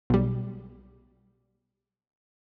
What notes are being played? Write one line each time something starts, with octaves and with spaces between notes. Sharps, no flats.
B1 G3